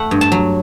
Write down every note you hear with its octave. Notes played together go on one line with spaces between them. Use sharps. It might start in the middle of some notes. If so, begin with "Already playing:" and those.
Already playing: A3 F#5
G2
A5
F#3